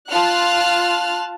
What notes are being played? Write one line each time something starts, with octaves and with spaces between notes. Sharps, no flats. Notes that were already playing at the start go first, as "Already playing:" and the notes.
F4 A5 F6 F#6